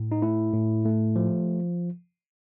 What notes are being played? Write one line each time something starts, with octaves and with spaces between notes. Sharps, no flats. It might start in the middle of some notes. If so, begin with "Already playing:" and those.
Already playing: A2
D#4
A3 E4
A2
A3
F3